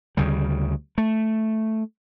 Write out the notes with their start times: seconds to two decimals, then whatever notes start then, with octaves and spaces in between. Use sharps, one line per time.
0.17 D2 C#3 G3
0.98 A3